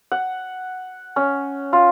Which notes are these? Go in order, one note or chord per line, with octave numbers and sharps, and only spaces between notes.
F#5
C#4
F4